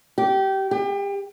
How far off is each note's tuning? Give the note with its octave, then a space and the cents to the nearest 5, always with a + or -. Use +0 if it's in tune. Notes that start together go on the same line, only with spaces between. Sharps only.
G4 -25
G4 +35